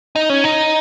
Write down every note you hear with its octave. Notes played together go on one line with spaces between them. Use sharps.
D#4
C#4
D#4